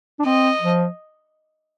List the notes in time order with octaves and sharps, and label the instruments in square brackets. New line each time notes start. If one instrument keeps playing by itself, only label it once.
[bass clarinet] D4
[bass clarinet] C4 [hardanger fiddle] D#5
[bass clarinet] F3